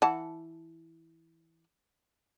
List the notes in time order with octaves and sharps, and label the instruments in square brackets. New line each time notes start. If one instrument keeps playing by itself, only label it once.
[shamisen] E3 F#5 A5